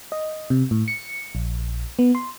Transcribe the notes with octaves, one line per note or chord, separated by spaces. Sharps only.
D#5
C3
A2
C#7
A#1
B3
C6